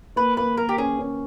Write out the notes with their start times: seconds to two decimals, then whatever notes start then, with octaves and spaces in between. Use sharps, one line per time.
0.16 A#3 B4
0.37 A#3 B4
0.57 A#3 A#4
0.69 G4
0.78 C#4 G#4
0.99 C#4